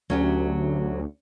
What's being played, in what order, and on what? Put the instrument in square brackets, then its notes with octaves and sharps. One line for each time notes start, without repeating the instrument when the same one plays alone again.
[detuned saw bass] D2 [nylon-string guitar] F#3 C#4 G4